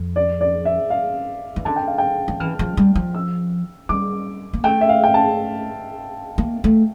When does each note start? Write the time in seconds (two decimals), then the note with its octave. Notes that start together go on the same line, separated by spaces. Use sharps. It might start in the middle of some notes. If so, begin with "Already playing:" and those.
Already playing: F2
0.16 D5
0.41 D5
0.65 E5
0.90 F5
1.56 E3
1.65 D3 A5
1.76 G5
1.88 F5
1.98 G5
2.28 F3
2.40 E3 F6
2.59 F3
2.77 G3
2.95 F3
3.15 E6
3.89 G3 D6
4.53 A#3
4.64 A3 G5
4.81 E5
4.89 F5
5.04 G5
5.14 A5
6.38 A#3
6.64 A3